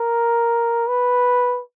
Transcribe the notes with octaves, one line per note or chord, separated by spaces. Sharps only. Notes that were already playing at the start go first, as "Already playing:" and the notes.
Already playing: A#4
B4